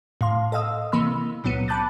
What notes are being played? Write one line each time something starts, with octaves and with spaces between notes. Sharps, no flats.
A2 F5 C6
A4 D#5 F5 D#6 E6
C3 E3 A#3 B5 E6
C#2 A#2 F#3 B3 C#7 D#7
A5 B5 D6 F#6 G6 A6